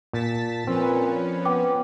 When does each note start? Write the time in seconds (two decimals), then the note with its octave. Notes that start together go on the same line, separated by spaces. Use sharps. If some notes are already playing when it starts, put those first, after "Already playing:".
0.13 A#2 A5 A6 B6
0.67 A#2 F3 C4 C#4 B4
1.45 B3 G5 D6